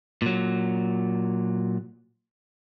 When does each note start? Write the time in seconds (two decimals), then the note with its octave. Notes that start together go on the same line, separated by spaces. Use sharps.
0.22 A#2 F#3